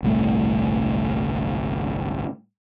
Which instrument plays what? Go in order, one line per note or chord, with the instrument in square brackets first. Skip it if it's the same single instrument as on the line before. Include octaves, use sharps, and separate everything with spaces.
[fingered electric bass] G1 C2 A2 A3